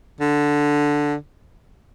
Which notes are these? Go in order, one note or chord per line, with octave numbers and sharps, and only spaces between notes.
D3